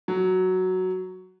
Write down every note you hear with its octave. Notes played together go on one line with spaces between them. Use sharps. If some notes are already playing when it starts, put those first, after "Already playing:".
F#3